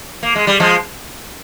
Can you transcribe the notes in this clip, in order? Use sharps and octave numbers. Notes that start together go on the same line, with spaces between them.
A#3
G#3
G3
F3 G#3